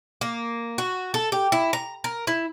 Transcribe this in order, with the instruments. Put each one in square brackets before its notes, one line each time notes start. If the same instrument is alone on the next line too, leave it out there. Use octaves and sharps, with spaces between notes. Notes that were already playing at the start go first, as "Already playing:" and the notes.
[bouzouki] A#3
F#4
A4
G4
E4
A#5
A#4
E4